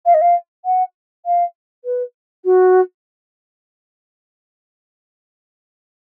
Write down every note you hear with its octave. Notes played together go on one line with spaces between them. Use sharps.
F5
D#5
F5
F#5
F5
B4
F#4